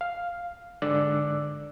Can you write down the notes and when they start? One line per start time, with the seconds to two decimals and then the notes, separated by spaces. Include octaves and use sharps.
0.01 F5
0.82 G#2 D3 D5 D6 E6 F#6